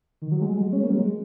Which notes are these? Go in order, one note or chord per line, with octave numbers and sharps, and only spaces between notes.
D#3
F#3
G#3
F#3
G#3
C#4
A#3
F#3
G#3
G#3